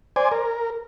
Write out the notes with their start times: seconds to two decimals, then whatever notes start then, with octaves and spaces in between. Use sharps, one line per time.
0.16 C5 D5 G#5
0.32 A#4